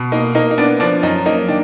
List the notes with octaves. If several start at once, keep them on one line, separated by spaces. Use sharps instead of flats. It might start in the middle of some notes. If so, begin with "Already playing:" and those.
Already playing: B2
A#3 D#4
A#3 D#4
D#4
B3 D4
F3 D4
F#2 D#4
A#3 D#4
D#3 D4